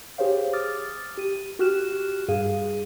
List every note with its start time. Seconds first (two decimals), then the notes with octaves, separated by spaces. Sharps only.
0.18 G4 G#4 C5 C#5 F5
0.53 D6 D#6 F6 A6
1.17 G4 D#7
1.59 F#4 G4 F6 F#6 E7
2.28 G2 G#4 F5 D#7